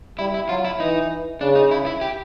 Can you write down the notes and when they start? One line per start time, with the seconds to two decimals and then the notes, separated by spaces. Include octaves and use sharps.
0.19 G3 E4
0.34 E4
0.49 F#3 F4
0.65 E4
0.80 E3 D#4
1.41 C#3 D4
1.55 D#4
1.71 E4
1.86 E4
2.01 G4